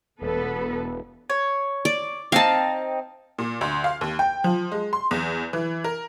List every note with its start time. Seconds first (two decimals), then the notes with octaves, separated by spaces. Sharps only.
0.22 E1 B3 A4 B4
1.30 C#5
1.85 D5
2.32 C4 D4 D#4 F5 A5
3.38 A#2
3.61 D2
3.84 F5
4.01 D#2
4.19 G5
4.44 F3
4.72 G#3
4.93 C6
5.11 E2
5.53 E3
5.84 A#4